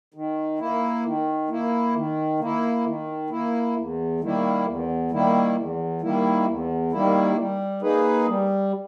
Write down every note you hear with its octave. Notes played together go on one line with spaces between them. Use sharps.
D#3
A#3 E4
D#3
A#3 E4
D#3
A#3 E4
D#3
A#3 E4
E2
D#3 G3 A#3 E4
E2
D#3 G3 A#3 E4
E2
D#3 G3 A#3 E4
E2
D#3 G3 A#3 E4
G3
A#3 D#4 G#4 B4
G3